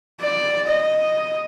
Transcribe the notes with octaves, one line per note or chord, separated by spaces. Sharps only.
D5
D#5